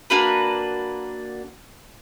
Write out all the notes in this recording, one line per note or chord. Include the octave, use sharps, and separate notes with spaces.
A#3 D4 F#4 B4